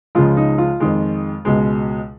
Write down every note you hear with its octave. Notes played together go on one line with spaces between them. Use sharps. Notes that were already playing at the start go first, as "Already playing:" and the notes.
C#2 C#3 F3 G#3 F4
D#4
F4
F2 D#3 G#3
C#2 B2 G#3